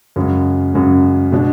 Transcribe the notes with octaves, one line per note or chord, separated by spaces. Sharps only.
F#2 C#3 G#3
F#2 C#3 G#3
B2 G#3 D4